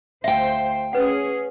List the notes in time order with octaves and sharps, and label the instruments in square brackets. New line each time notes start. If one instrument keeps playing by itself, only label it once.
[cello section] D2 C5 [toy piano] E5 [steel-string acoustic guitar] F5 G5
[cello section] C#4 G#4 [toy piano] B4 F#5